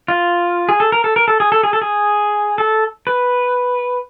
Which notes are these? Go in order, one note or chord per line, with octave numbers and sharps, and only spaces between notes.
F4
G#4
A4
A#4
A4
A#4
A4
G#4
A4
G#4
A4
G#4
A4
B4